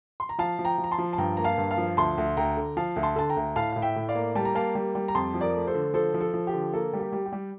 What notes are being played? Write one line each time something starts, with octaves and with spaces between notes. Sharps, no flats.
C6
A#5
F3 F5 A5
F3
G5 A#5
F3
A#5
A5 C6
F3
A5
G2 G5 A#5
A#3 A#5
F5 A5
G2
F5 A5
F3
D2 A5 C6
D2
D2 G5 A#5
D3
F3 F5 A5
D2
A5 C6
D3 A5
G5 A#5
D2
A2 F5 A5
A2 F5
E5 G5
A2
D5 F5
A#3
G3 A5
A#5
A#3 F5 A5
G3
G3
A#5
F2 A5 C6
F3
A#4 D5
A3
A4 C5
D3
F3 A4 C5
F3
A4
F3
G4
D3
A#3 A4
G3
G4
G3
G4
G3